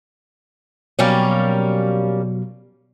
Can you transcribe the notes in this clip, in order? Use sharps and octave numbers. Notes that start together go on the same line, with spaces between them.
B2 F#3 G3 A#3 C#4